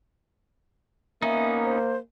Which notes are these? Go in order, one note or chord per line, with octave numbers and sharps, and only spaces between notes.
A#3 B3 C#4 D#4 E5
C5